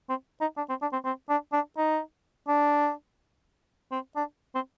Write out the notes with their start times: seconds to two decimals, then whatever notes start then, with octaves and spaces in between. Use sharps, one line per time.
0.09 C4
0.41 D#4
0.57 D4
0.69 C4
0.82 D4
0.93 C4
1.05 C4
1.29 D4
1.53 D4
1.77 D#4
2.48 D4
3.91 C4
4.16 D4
4.55 C4